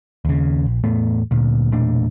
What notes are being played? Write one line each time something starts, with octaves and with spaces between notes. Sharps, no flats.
D#2 C#3
A#1
E2 A2 A3 B3
D2 A#2
E1 A#2 A3 D4